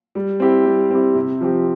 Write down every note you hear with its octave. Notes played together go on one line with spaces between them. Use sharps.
G3
C4 E4 G4
G3
C4 E4 G4
C3
F3 C4 G4